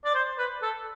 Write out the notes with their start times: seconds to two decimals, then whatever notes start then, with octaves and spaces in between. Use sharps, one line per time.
0.05 D5
0.14 C5
0.38 B4
0.62 A4